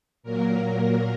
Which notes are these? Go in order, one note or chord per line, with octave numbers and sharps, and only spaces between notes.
A#2 F#3 A#3 A#4